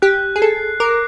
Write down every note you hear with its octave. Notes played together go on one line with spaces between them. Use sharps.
G4 F#6
G#4
A4 C7
A#4 D6